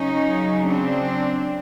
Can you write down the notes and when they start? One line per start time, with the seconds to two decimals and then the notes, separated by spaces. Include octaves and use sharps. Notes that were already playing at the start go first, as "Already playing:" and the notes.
Already playing: C#3 F#3 C#4 D#4
0.67 C4 D4